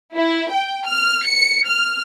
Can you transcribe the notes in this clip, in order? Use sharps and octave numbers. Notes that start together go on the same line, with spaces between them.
E4
G5
F6
C#7
F6